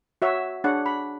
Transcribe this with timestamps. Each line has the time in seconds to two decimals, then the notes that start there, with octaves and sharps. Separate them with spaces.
0.22 F#4 C#5 E5
0.64 D4 G#4 C#5 F#5
0.86 B5